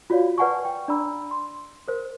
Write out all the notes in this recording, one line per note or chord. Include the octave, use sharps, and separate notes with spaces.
F4 F#4 C#5 D5 F5
B4 D5 F#5 G#5 A5 C#6
G5
D4 D5 A#5 B5 E6
C6
A#4 C5